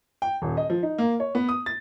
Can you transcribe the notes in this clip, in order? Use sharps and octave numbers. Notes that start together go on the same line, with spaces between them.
G5
D#1
D#5
F3
D#4
A#3
C#5
B3
D#6
A6